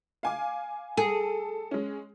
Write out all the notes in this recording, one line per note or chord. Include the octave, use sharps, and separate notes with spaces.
F5 G#5 D6
G#4 A4
G#3 C#4